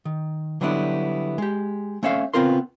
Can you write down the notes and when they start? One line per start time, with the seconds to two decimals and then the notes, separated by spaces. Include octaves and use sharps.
0.05 D#3
0.61 D3 F#3 G3 B3 D4 E4
1.38 G#3 G4
2.03 A3 C#4 C#5 E5 F5
2.34 C#3 B3 C4 F4 A#4 C6